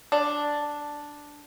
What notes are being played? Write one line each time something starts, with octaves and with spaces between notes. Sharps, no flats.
D4